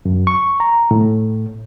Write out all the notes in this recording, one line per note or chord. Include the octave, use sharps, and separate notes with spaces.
F#2
C#6
A#5
A2